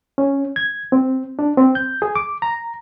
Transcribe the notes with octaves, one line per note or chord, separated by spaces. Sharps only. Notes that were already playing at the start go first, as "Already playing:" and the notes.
C#4
G#6
C4
D4
C4
G6
G#4
D6
A#5